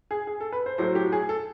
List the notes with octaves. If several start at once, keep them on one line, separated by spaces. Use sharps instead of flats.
G#4
G#4
A4
B4
C5
A2 F#3 A3 C5
G4
G#4
A4